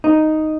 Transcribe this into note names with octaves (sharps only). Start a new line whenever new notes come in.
D#4